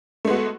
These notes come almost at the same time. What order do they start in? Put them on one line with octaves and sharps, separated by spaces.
A3 G#3 B3 F#4